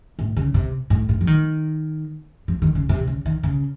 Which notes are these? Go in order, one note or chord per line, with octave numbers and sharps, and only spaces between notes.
A2
C#3
C3
A2
A2
F3
D#3
F3
D#3
C#3
C3
C#3
D#3
C#3